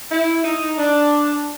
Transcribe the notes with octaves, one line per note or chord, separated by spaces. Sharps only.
E4
D#4
D4